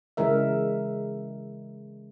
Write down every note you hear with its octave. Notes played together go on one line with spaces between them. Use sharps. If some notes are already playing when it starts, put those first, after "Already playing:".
C#3 E3 G#3 A#4 E5